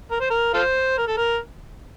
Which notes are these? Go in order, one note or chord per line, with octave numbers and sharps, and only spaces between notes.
A#4
C5
A#4
F4 A4 C5
A#4
A4
A#4